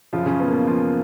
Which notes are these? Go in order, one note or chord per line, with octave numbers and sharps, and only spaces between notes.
F#2 C#3 F3 F4
C#3 C#4
B2 B3
A#3
B2 B3
F3 F4